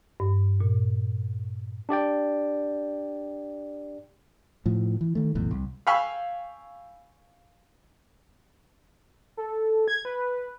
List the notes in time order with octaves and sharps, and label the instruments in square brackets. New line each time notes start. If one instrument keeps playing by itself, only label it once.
[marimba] G2
A#2
[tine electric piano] D4 G4 D5 G5
[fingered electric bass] A2 F3
E3
D#3 A3
F1 B1 E2 A2
C2
[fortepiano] F5 G5 G#5 B5 C#6 E6
[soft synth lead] A4
G#6
B4